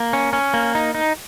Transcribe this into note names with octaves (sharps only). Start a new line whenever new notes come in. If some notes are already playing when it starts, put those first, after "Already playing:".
Already playing: A#3
C#4
C#4
A#3
D#4
D#4